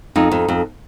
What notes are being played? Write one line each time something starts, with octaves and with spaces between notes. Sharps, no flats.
F2 D#4
F2
F2